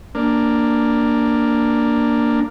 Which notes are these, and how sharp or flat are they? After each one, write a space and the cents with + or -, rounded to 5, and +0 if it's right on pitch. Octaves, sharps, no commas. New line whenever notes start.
A#3 +0 D4 +0